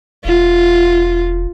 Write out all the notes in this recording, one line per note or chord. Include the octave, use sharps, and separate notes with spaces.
E1 F4